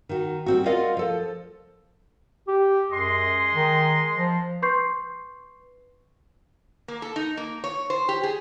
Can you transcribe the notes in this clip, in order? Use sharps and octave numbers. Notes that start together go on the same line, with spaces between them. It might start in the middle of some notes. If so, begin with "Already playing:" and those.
D#3 F#4
G3 C4 F#4
F4 A#4 D5 D#5 F5 F#5
F3 A4
G4
F#2 G#3 D#5 C6
D#3
F3
B4 C6 C#6 G6 C7
A#3
A4
D#4
A#3
C#5
C5
G4
G#4